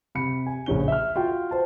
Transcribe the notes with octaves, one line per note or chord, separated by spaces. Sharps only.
C3 B5 C#7
G#5
A#1 C#3 C#4 G7
E5 F6
F4 F#4 G5
C5 A5